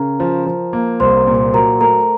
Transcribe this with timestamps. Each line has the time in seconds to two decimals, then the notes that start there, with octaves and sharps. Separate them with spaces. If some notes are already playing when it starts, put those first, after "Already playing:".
Already playing: C#3 A#4 A#5
0.20 F3
0.46 F3
0.73 A#3
1.00 C2 C5 C6
1.27 A#2
1.54 F#3 A#4 A#5
1.81 A3 A#4 A#5